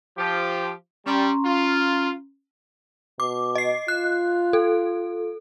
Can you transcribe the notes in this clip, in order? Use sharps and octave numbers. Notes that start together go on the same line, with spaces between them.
F3 G4
G3 C#4 A#5 C6
F4
B2 D6
D#5 C7
F4 F#6
A4